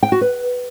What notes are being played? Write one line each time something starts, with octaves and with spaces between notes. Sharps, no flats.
G5
F#4
B4